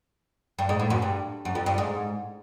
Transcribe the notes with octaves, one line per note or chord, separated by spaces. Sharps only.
G2
G#2
A2
F#2
G2
F#2
F2
G2
G#2